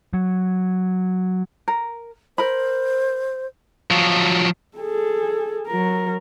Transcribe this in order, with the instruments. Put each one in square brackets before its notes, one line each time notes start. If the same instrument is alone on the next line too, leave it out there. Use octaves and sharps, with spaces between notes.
[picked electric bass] F#3
[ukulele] A#4
[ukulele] A#4 B5 [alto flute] C5
[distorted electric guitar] F3 F#3
[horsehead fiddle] G#4 A4
F#3 A#4